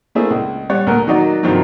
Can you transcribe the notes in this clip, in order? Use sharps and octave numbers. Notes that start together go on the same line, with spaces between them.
A3 A#3 C4 D4 E4 G#4
C#2
G3 C#5 D5 F#5
D2 A#2 A#4 F#5
D#3 F#3 D#4 F#4 D5
G2 C3 D#3 F3 F#3